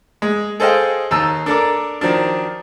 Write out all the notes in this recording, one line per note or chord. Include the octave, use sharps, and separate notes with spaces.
G#3
G#4 A4 C5 D#5 F5 G5
D#2 D#4 A5 E6
D4 A4 A#4 D6
D#3 F3 F#3 D4